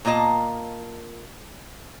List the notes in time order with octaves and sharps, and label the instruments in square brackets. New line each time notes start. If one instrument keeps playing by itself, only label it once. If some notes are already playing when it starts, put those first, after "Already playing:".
[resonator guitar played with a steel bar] A#2 A#3 F4 D#5 A5